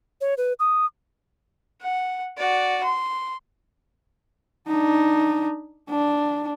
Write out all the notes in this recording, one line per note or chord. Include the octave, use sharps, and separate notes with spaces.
C#5
B4
D#6
F#5
F#4 D5
C6
D4 D#4
D4